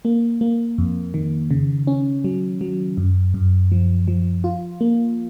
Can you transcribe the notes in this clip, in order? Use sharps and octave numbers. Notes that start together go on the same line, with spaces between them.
A#3
A#3
F2
D#3
C#3
C#4
F#3
F#3
F#2
F#2
F3
F3
F4
A#3